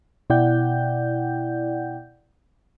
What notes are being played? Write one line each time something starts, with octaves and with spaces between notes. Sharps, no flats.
B2 E4 D5 F#5 G5 G6